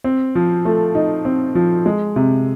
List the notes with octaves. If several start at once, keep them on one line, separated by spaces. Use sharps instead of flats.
C4
F3
A3
D#4
C4
F3
G#3
C3